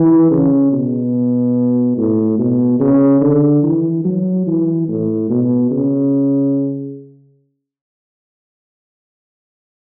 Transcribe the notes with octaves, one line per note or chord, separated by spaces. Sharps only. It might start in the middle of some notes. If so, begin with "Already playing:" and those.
Already playing: E3
C#3
B2
A2
B2
C#3
D3
E3
F#3
E3
A2
B2
C#3